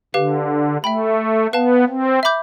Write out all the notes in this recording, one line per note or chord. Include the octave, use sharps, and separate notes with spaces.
D3 G4 B4 F5
A3 E5 G5 B5
B3 B4 F5 A5
C4
E5 B5 D6 G6